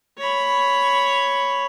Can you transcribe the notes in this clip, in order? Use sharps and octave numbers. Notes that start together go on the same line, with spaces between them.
C#5 B5